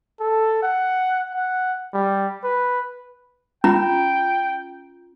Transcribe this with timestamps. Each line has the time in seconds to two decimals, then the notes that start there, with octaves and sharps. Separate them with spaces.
0.20 A4
0.63 F#5
1.35 F#5
1.94 G3
2.44 B4
3.64 C#4 F4 G5 A#5